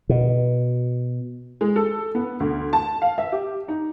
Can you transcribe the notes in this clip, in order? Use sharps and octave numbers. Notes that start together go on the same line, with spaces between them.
B2
G#3
A4
B3
D2
A5
F5
E5
G4
D#4